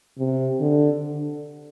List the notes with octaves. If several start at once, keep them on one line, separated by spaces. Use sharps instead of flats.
C3
D3